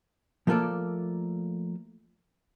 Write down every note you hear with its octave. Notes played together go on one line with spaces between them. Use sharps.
F3 A3 A#3 F4 A4 D5